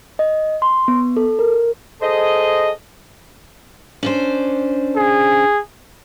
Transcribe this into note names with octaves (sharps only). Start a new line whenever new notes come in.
D#5
C6
B3
A4
A#4
G#4 A4 C5 D#5
C#4 D4 C5
G#4